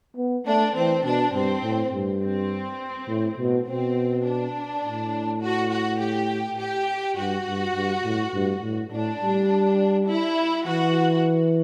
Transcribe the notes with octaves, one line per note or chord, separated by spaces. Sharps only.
B3
A3 D4
E3 C4
B2 D4
G2 C4
A2
G2
C4
A2
B2
B2 C4
D4
A2
F#4
F#4
G4
G4
G2 F#4
G2
G2
A2
G2
A2
A2 D4
G3
E4
E3 F#4